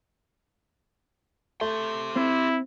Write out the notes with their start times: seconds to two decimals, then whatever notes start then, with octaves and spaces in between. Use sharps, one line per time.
1.61 A3 G4 C6
2.16 C4 E4